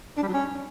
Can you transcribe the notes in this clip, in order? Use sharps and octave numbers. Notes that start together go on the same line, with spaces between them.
D4
G3
F#3
C#4